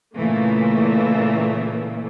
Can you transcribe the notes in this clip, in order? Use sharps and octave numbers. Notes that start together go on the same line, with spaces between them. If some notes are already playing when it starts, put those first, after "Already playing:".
A#2 C#3 E3 A3 A#3